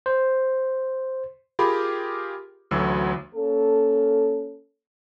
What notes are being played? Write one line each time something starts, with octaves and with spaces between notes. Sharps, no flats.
C5
F4 G4 G#4 A#4 B5
A1 D2 A2 F#3 E6
A#3 C#4 A4